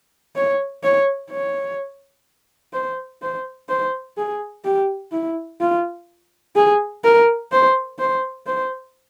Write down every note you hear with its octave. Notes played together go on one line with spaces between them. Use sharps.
C#5
C#5
C#5
C5
C5
C5
G#4
G4
E4
F4
G#4
A#4
C5
C5
C5